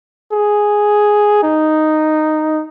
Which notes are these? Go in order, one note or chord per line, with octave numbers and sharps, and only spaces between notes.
G#4
D#4